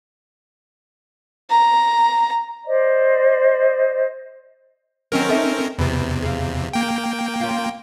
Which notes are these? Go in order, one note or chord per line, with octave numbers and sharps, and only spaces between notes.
A#5
C5 D5 D#5
D#3 F#3 C4 C#4 A#4
D#4 A4 E5
E2 C3 B3
G#4 F5
A#3 G5
C#4 F4